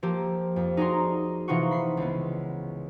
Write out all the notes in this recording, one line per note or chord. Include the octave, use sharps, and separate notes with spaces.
F3 A#3 G4 A4
F2
D#4 F#4 G#4 D5 A#5 C6
C3 E3 D#4 F4 F#5 C#6
B5 C7
C#2 B3